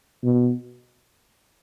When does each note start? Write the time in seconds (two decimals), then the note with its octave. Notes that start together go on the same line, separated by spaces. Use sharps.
0.24 B2